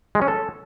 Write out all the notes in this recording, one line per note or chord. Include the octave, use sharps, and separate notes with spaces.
G#3
C#4
A4